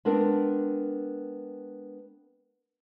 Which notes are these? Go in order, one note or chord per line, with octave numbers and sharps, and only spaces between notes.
G#3 B3 C4 D4 A#4